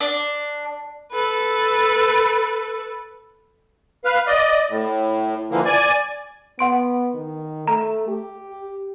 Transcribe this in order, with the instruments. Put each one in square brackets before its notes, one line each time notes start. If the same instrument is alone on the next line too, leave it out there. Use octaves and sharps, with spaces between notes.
[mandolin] D4
[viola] A4 B4
[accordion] B4 F5
D5 D#5
A2
D3 E3 F3 A#3
D5 G#5
[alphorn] B3 [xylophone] F#5 C6 D7
[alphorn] D#3
[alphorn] A3 [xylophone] A#5
[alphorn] G4